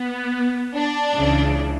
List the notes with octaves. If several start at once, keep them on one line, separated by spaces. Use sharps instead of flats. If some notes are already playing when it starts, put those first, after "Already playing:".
Already playing: B3
D4
C#2 C#3 E3